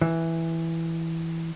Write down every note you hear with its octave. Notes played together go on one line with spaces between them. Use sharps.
E3